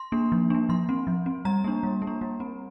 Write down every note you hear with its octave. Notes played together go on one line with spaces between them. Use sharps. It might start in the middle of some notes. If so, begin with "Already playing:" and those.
Already playing: C6
A#3 D4
F3
A#3 D4
F3 C6
C4
F3
C4
G3 A#5
A#3 D4
G3
A#3
D4
G3
C4